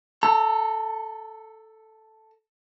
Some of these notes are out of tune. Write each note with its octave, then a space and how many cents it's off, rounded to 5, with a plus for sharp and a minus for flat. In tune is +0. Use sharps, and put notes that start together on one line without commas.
A4 +0 A#5 -40